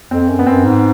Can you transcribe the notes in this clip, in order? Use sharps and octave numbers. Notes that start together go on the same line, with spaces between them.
F2 C4
F#2
B3
F#2 C4
G#2